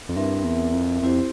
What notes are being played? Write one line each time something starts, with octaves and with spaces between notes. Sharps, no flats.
F2
G2 C4 E4 A#4 E5
E2
F2
F2 C4 E4 G4 C5